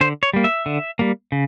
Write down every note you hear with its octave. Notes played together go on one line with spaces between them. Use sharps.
D3 C5
C#5
G3 A#3
E5
D3
G3 A#3
C#3